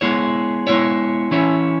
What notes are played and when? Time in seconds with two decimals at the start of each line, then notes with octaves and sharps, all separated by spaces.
0.01 G#3 B3 E4 G#4 C#5
0.67 G#3 B3 E4 C#5
1.31 E3 C#4 E4 C#5